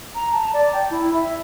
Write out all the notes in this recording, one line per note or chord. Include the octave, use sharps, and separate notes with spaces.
A#5
A5
D5
G5
E4
E5